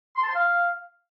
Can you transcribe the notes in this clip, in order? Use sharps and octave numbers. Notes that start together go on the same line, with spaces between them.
C6
A5
C6
F5